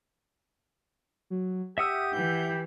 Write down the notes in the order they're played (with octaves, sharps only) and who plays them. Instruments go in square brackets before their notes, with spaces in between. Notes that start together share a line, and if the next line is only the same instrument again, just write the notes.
[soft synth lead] F#3
[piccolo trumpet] G4 [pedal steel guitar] E5 F#5 E6 [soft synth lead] D#6
[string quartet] E3 [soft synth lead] G6